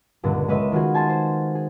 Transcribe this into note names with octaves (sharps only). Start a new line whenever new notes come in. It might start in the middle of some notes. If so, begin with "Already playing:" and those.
C#2 G2 A#2 D3 B3
G#3 C#4 B4 D#5 E5
D#3 F4 F#4 G#4
G#5 A5 C6 G#6
C5
G#4